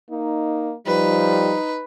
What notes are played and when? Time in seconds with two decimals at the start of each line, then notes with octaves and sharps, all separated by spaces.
0.10 A#3 D#4
0.87 F3 G3 D#4 B4